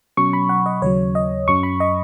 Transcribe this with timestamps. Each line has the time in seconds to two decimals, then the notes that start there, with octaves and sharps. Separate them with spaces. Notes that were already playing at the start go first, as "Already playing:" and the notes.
0.17 B2 F#3 C#4 C#6
0.33 B5
0.49 F#5
0.66 D#5
0.82 D#2 C#3 F#3 C#5
1.15 D#5
1.48 F#2 F#3 C#4 C#6
1.63 B5
1.80 D#5